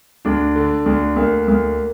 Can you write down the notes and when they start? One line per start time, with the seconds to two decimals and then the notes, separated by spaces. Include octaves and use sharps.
0.25 D2 D4
0.56 D3
0.86 D2
1.16 D2 A#3
1.48 D2